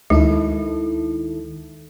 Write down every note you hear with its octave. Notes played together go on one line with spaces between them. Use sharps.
D2 D#3 G#3 E4 A4